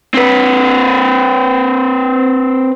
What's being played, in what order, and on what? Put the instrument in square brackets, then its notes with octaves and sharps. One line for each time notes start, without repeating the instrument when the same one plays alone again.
[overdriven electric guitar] C4 B4